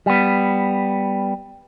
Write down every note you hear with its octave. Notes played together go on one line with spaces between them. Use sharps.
G3 B3